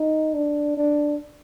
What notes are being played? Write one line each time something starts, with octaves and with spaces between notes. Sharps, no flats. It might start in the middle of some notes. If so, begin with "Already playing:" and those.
Already playing: D#4
D4
D4